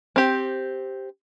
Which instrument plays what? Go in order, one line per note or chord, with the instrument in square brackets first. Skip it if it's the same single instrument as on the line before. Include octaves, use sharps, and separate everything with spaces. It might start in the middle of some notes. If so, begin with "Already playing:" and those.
[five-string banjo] C4 G4